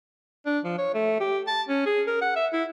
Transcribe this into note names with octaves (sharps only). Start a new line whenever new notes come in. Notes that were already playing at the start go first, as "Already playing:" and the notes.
D4
F3
C#5
A3
G4
A5
C#4
G#4
A#4
F#5
E5
E4